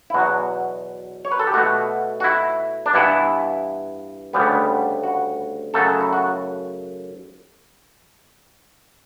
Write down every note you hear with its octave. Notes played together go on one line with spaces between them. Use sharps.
E4
E2 B2 F#3 F#4
C#5
B4
A4
G4
B2 A3 F#4
F#4
E4
D4
G2 E3 B3 E4
D2 C#3 G3 B3
F#4
F#2 C#3 F#3 A3 A4
E4
F#4